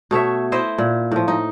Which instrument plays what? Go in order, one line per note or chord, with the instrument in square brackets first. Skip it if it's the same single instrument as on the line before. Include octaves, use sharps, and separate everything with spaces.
[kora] B2 A3 C#5 E5
E4 C5 D#5 E5
A#2
A2 F3
D#4